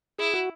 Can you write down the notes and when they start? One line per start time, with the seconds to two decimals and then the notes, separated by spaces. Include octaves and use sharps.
0.19 E4 G#4
0.34 F#4